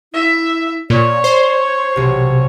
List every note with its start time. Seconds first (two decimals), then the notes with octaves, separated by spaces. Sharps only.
0.13 E4 E5
0.90 A#2 C#5 D5
1.24 C5
1.96 B1 C3 G4